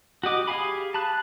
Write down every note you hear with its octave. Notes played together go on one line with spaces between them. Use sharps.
F#4 G4 D#5 D6
G4 G#4 F5 G#5 B5
A5 B5 F#6